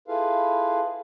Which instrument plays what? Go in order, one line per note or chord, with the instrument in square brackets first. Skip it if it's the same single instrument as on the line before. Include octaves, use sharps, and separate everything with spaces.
[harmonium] E4 F4 G#4 A4 B4 F5